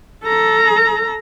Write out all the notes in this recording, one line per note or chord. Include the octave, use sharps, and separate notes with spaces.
A4 A#5